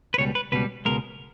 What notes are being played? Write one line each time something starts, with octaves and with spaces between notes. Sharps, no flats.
B4
C#2 B2 G3 C#5
B4
C#2 B2 G3 B4
C#2 B2 G#3 A#4